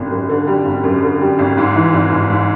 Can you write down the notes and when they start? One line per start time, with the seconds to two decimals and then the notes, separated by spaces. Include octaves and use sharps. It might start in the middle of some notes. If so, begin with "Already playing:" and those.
Already playing: G#1 F#2 D3 G3
0.11 F#2
0.29 D3
0.47 G3
0.65 G#1
0.84 F#2
1.02 D3
1.21 G3
1.39 G#1
1.57 G#2
1.75 E3
1.93 G#1
2.12 G#1
2.30 G#2